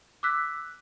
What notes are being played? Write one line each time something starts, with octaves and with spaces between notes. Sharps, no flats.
D6 E6 F#6 B6